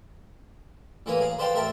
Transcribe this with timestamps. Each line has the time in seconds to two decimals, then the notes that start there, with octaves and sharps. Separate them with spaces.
1.06 A1 E3 A#3 B4 A#5 D#6
1.21 G#4 F5
1.38 B4 C5 D5 F5 G5 A5
1.55 A1 A#4 E5 G5 A5